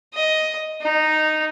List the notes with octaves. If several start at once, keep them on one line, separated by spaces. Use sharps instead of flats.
D#5
D#4